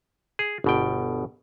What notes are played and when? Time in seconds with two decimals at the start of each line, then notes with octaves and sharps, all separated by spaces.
0.39 G#4
0.64 G1 B2 G5